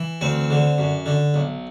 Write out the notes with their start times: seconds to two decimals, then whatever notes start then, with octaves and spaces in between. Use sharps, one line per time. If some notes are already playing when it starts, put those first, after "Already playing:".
Already playing: E3
0.21 D2 C4
0.50 D3
0.78 F#2
1.06 D3
1.34 B1